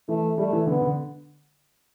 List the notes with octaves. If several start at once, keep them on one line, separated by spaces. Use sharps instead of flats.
E3 A3
G3 A3
E3
D3 B3
D3